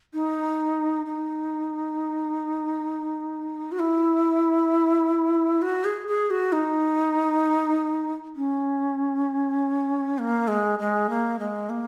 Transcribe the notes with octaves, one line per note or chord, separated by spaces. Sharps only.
D#4
D#4
F#4
E4
F#4
G#4
G#4
F#4
D#4
C#4
A#3
G#3
G#3
A#3
G#3
A#3